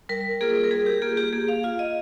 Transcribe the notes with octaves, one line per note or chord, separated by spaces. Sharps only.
G3 A#4
A#3 F4 G#4
A#4
G3 G#4
G4
A#3 F4 G#4
G4
A#3 G#4
F5
F4 F5
D#5